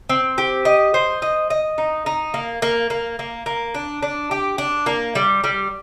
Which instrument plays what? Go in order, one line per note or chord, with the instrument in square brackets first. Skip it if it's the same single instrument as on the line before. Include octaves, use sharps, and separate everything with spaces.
[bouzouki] C4
G4
D#5
C5
D#5
D#5
D#4
D#4
A#3
A#3
A#3
A#3
A#3
D4
D4
G4
D4
A#3
G3
G3